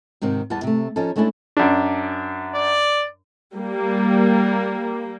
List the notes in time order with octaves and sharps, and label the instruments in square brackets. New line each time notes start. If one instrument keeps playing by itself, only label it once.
[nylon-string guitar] G#2 C3 D#3 C4
E2 E3 G3 B3 A5
C3 A3
F3 C#4 D#4 A4
G#3 A3 C#4 D4 E4 A4
[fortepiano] F#2 D4
[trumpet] D5
[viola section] G3 A#3